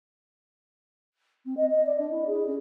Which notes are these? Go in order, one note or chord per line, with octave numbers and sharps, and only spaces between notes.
C4
D#5
D#5
D5
D4
E4
G#4
C#4